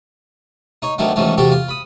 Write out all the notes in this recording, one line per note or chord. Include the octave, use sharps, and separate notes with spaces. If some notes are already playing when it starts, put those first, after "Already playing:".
D#4 C#5
D2 D3 D#3 F#3 A3 B3
D#2 G#2 E3 F#3 A3 C#4
E2 C3 F#4 G4 A4
F4
B5 D#6